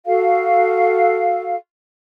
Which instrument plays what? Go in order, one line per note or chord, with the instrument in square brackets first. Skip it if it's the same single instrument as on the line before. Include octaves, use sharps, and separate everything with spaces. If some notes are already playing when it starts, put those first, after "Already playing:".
[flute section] F#4 A4 F5